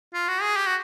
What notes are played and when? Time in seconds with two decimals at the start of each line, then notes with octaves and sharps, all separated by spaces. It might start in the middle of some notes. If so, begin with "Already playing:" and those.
0.14 F4
0.28 F#4
0.42 G#4
0.56 G4
0.66 F#4